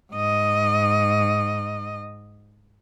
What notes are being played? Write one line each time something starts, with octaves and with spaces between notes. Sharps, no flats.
G#2 D#5